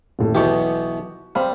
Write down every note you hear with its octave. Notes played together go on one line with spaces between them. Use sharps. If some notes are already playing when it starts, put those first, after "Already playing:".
D#1 A2
B1 B2 E3 F#4 G4 C#6
G3 C4 F5 B5